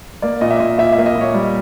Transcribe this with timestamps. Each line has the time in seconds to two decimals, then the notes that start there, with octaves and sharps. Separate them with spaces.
0.22 A#3 D5
0.41 A#2 D#5
0.51 E5
0.60 A#2 D#5
0.78 A#2 E5
0.92 E5
0.98 A#3
1.06 D#5
1.16 A#2
1.21 C#5
1.34 G3 D5